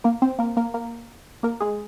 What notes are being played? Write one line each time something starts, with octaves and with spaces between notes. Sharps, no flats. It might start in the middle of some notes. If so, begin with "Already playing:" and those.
A#3 A#4
C4 C5
A#3 A#4
A#3 A#4
A#3 A#4
A#3 A#4
G#3 G#4